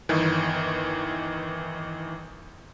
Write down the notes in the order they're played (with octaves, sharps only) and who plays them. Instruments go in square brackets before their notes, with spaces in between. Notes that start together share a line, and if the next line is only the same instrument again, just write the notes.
[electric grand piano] G1 D#3 E3